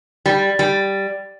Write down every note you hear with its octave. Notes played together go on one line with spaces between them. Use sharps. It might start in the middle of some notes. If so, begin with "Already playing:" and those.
G3
G3